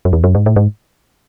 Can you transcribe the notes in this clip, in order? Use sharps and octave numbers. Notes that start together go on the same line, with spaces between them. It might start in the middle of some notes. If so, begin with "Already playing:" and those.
F#2
E2
F#2
G#2
A2
G#2